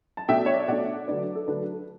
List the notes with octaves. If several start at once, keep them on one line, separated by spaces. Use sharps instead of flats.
A5
B2 A3 D4 E5 G5
C#5
D5
E5
B2 A3 D4 D5 F#5
D3 F#3 A3 D4 B4 D5
A4
D3 F#3 A3 D4 B4